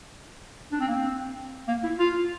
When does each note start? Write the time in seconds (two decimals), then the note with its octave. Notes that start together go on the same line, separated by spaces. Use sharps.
0.72 D4
0.81 C4
0.88 A#3
0.95 C4
1.68 A#3
1.84 E4
1.99 F4